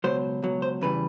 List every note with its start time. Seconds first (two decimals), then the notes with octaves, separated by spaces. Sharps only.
0.04 C#2 B2 F#3 C5
0.42 C#2 B2 F#3
0.62 C5
0.81 E2 C#3 E3 G3 B4